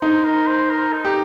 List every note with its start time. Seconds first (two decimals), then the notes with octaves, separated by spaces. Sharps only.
0.02 D#4 C5
0.25 A#4
0.47 C5
0.71 A#4
0.93 D#4
1.05 G4